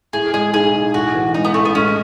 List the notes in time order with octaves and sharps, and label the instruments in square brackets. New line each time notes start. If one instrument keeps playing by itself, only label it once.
[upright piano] A2 [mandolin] G#4
[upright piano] G#3 [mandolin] G#4
[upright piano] B1 [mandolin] G#4
[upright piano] B1
[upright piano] A2 [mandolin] F#4
[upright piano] E3
[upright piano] G#3 [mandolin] D#4
[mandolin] B3
[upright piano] A1 [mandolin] A3
[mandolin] B3
[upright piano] G#3 [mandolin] C#4